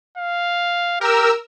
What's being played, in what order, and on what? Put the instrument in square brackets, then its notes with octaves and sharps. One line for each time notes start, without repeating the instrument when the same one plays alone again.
[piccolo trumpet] F5
[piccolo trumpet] G4 [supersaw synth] A#4 E6